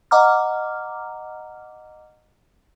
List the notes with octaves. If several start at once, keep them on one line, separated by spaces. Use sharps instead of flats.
D#5 F#5 A#5 D6 F6